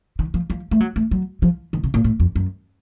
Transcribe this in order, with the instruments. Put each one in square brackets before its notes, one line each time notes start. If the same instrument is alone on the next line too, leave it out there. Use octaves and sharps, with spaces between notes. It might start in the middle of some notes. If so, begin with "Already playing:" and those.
[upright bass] D#3
F3
F3
A3
F#3
A3
F#3
F3
D#3
C3
A#2
A2
F2
F#2